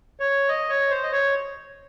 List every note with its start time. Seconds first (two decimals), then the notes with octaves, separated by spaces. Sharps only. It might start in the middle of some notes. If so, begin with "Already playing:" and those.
0.20 C#5
0.49 D#5
0.69 C#5
0.90 C5
1.03 D#5
1.12 C#5